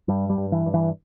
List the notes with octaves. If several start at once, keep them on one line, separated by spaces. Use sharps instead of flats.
G2 G3
G3
G2
E3
G2
E3